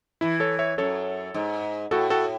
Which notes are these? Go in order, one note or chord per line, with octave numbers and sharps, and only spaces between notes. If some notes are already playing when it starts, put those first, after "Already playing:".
E3 E4
A4 C#5
C#5 E5
F#2 A4 C#5
G#2
A2 F#4 A4
F#4 A4